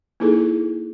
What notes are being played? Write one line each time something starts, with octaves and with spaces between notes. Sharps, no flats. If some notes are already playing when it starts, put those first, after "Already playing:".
A#3 D#4 E4 G#4 A4